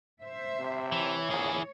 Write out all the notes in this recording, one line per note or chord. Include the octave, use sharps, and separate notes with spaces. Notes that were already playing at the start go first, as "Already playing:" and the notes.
C5 E5
C3
E3 C#5
A#1 E3 G#4